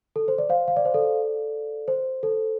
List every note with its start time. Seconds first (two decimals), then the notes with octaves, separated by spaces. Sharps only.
0.16 A4
0.28 C5
0.38 D5
0.49 C5 F5
0.68 F5
0.77 D5
0.85 C5
0.94 A4 D5
1.88 C5
2.23 A4